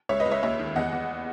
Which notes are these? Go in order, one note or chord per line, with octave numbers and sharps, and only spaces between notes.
C#2 C#5 E5
B4 D#5
C#2
C#5 E5
D#2 C#5 E5
D#3
E2 D#5 F#5
E2